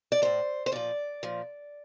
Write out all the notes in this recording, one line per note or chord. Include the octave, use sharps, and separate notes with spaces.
D5
A2 F3 C5
C5
A#2 F3 D5
A#2 F3